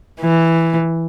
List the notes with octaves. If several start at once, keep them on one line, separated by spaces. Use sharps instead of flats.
E3